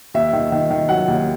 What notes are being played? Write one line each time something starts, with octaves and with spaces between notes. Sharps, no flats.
D#2 E5
D#3
D#3
D#3
F#3 F#5
D#2